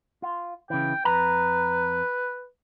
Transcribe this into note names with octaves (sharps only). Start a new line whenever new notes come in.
F4
C#3 E3 G5
F2 B4 A#5